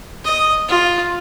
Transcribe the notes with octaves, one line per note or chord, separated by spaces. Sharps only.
D#5
F4